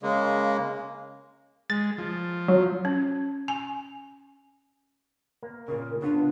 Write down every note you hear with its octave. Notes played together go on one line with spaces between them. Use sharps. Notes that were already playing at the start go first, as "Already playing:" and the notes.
C#3 G#3 A#3
G#3 A6
F3
F#3
C#4
G#5
A#3
A#2 C#3 A#4
C#3 B3 D4 F4